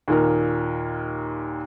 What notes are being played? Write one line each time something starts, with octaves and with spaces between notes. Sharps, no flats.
D#2 A#2 A#4